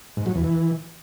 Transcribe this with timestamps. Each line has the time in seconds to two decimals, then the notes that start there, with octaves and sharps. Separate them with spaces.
0.17 G#2
0.26 F#3
0.35 E2
0.44 E3